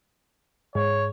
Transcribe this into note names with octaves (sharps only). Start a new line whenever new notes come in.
G#2 C#5